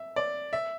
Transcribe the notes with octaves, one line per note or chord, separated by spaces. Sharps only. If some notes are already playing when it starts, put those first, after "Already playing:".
Already playing: E5
D5
E5